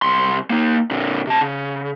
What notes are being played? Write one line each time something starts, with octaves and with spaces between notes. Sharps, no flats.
C2 C6
A#3 D#4
A#2 D3
C3 A5
C#3